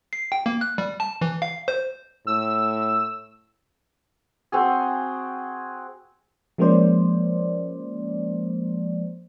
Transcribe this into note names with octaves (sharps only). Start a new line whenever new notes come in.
C7
G5
A#3
F#6
G3
A5
E3
F5
C5
A2 E6
C4 F#4 G#4
F3 G#3 A#3 C#4 C5 D5